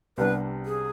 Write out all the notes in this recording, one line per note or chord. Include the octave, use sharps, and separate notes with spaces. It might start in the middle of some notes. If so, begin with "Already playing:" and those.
C2 C3 G3 B3 D4 B4
G#4